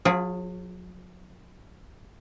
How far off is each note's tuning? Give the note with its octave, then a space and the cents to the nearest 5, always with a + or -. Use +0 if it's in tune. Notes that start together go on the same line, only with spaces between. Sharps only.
F#3 -40 F4 +0 G#4 +0